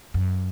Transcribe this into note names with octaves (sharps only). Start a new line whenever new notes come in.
F#2